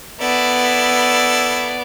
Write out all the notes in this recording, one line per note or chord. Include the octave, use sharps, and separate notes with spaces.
B3 E4 A4 D5